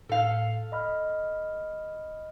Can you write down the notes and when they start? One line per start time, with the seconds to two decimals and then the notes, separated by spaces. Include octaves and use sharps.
0.09 A2 A4 F5
0.72 D#5 B5 F6